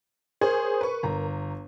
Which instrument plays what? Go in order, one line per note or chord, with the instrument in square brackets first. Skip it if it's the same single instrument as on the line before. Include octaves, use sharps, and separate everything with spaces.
[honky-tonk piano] G#4 C5 C#5 [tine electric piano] A#4
[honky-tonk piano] B4 C#6
G1 A#5